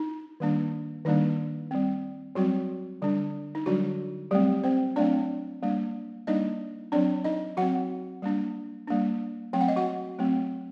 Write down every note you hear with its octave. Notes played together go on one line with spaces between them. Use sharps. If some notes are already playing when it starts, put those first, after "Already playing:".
Already playing: D#4
D#3 G3 A#3 D4
D#3 G3 A#3 D4 D#4
G3 C4
F#3 G3 C4 F#4
D3 G3 D4
D#4
D3 F#3 G3 D4 F#4
F#3 G3 A3 C4 G4
C4 C5
F#3 A3 C4 D4 D5
G3 A#3 D4
G3 A#3 D4 D#4 D#5
F#3 C4 D4 D5
D#4 D#5
F#3 C4 F#4 F#5
G3 A#3 D4
G3 A#3 D4
F#3 A3 C4 G5
F#5
D#5
F#4 F#5
F#3 A3 C4